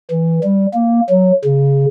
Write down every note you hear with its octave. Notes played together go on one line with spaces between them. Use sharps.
E3
G3
A#3
F#3
C#3